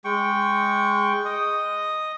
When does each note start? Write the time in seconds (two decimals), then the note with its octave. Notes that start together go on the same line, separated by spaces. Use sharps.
0.05 G#3 G5 C#6
1.25 D#5 D#6